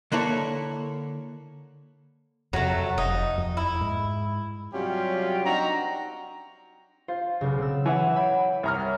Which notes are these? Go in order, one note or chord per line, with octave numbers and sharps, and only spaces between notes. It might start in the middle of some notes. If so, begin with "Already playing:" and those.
D3 A#3 E4 A4 C#5
F2 C3 F#3 A3
F1 D#4
F2
E4
G#2
C3 F#3 G3 C#4 F4 G4
C4 D4 D#4 F#4 A#5
F4 C5
B1 C#3
C4 E6
E3 C#5 E5 F#5
E5 B5 G6 D7
C2 C#5 A#5 F6